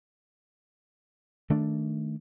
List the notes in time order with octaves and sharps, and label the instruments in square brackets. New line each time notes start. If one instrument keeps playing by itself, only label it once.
[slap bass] D#3 A3 D4